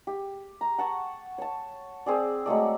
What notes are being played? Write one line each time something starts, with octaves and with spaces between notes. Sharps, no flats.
G4
A#5
F#5 A5 C#6
C#5 A5
C4 G#4 D5
F#3 G#3 A3 D5